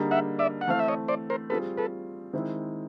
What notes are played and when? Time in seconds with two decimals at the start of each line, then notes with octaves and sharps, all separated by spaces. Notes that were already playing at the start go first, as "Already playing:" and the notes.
Already playing: D3 G3 A#3 D#4 G#4
0.11 E5 F#5
0.39 D5 E5
0.61 F#5
0.68 E3 A3 C4 F5
0.79 E5
0.88 C#5 D#5
1.08 C5 D5
1.30 A#4 C5
1.50 G3 C4 F4 G#4 A4 B4
1.77 A4 B4
2.33 D#3 G#3 C4 E4